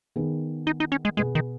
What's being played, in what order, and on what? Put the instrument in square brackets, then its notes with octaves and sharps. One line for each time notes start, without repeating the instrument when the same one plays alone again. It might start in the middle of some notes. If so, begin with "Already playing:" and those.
[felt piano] D#3 B3 G#4
[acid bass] D#4
D#4
C#4
G#3
[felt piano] B2 B3 G#4 [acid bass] G#3
[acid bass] D#3